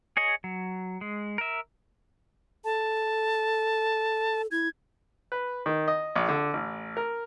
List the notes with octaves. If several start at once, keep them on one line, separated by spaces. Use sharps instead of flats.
G#4 C#5 D#5
F#3
G#3
A#4 E5
A4 A5
E4 G#6
B4
D#3
D#5
A#1
D3
A1
A#4